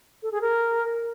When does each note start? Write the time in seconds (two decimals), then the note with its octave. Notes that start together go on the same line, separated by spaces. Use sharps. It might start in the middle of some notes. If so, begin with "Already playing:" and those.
0.23 A4
0.32 G#4
0.41 A#4